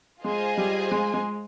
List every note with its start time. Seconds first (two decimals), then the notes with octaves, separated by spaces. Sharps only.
0.23 G#3 F4 G#4 C5 D#5 G#5
0.57 G3
0.91 G#3
1.14 G#3